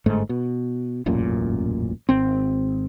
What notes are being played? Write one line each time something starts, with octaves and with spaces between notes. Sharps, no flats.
G1 G#2 A3
B2
E1 A1 F#2 A#2
G#1 C4